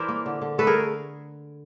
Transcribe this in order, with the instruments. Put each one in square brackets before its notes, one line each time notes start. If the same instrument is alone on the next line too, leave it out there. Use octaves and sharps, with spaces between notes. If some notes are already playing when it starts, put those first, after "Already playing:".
Already playing: [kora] E3 A#4 C5 D5 E5
A#3
D3
D3
A3 A4 B4
G#4 A#4